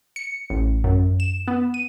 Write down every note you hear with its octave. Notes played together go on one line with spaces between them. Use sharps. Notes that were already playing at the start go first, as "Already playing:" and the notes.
C#7
A1
F#2
E7
B3
D#7